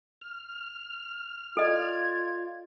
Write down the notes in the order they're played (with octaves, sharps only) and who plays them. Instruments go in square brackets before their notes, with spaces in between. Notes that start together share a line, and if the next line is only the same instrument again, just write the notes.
[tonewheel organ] F6
[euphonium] F4 [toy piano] A4 D#5 [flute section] D5 G#6